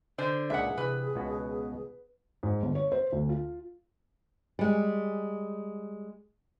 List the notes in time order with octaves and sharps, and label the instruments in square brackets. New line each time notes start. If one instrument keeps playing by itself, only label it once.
[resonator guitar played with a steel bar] D3 C5
[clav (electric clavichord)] C#2 A#2 B4 [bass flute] G#4 [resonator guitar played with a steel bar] E5 F#5
[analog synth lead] C3 [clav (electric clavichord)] E3 [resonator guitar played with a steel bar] B4
[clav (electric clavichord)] C#2 B3 F#4 [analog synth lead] B2
[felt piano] G#2
G1
C#5
C5
D2
F4
[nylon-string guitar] G3 G#3